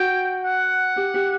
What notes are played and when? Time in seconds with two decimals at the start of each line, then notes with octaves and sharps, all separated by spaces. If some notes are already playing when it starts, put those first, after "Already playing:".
Already playing: F#4 G5
0.45 F#5
0.96 G4
1.14 G4